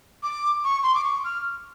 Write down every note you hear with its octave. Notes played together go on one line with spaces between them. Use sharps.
D6
C#6
C6
D6
C#6
F6